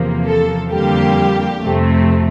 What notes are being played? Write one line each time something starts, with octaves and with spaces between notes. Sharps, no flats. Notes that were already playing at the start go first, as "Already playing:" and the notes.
Already playing: E2 C3 F3 A#3
A4
F2 D3 G3 A#3 G4
F2 C3 F3 A3